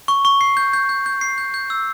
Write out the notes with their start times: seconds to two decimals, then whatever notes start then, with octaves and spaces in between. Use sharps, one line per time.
0.08 C#6
0.25 C#6
0.41 C7
0.57 G6
0.73 G6
0.89 G6
1.06 G6
1.21 C7
1.38 G6
1.54 G6
1.70 E6